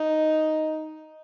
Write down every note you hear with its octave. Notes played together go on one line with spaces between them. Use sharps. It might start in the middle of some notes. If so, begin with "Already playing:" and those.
Already playing: D#4